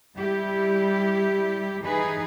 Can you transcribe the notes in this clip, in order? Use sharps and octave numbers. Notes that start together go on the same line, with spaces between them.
G3 E4 G4
E3 D#4 G#4 B4